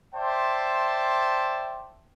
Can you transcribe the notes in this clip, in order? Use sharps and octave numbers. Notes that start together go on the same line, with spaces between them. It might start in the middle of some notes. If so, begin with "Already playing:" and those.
C5 D5 E5 G5 A5 C6